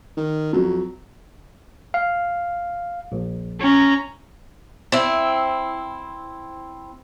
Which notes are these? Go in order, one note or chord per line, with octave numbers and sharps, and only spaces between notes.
D#3
F2 F#3
F5
A#1
C#4 A#5
C4 E4